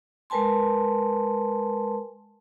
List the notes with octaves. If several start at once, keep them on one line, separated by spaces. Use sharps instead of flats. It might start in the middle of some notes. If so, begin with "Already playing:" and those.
G#3 A#4 B4 G#5 A5 C6